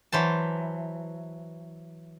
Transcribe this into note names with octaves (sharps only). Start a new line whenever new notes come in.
E3 F#3 C5 A5